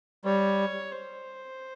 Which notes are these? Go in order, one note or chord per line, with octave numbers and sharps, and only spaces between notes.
G3 C#5
C5